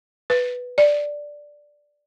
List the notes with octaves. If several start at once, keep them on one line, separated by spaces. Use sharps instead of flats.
B4
D5